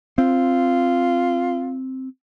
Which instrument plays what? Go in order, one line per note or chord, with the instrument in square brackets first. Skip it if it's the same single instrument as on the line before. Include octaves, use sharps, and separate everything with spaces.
[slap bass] C4 [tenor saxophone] F4